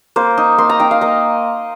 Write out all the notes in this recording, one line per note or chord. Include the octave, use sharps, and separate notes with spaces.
A#3 C5
D#4
A#3 C6
A#5
D#4 G5
F5
A#3 D#5